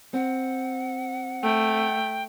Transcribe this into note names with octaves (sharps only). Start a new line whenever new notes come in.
C4 F#5
A3 G5